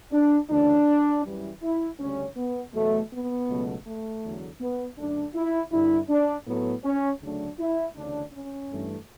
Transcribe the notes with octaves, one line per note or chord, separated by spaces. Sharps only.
D4
D2 C#3 E3 D4
F#2 E3 G3
E4
D2 C#3 G3 C#4
B3
E2 B2 F#3 A3
B3
C#2 B2 F#3 A3
A3
E2 D3 F#3
B3
F#2 D3 A3 D4
E4
G2 D3 G3 E4
D4
A2 F#3 A3 B3
C#4
D2 C#3 F#3 A3 D4
E4
D2 C#3 E3 D4
C#4
G2 E3 A3